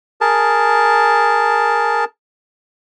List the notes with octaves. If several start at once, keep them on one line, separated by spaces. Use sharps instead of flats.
G#4 A#4 A5